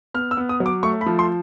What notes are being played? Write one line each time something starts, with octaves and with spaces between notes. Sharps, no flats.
B3 F6
E6
B3
D#6
F#3
D6
A3 C#6
B5
F3
C6